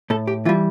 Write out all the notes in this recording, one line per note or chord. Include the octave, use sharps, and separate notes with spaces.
A2 A4
G4
E3 G3 F4